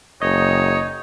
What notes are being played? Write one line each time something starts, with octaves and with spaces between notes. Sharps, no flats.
F#1 D#4 C#5 D#5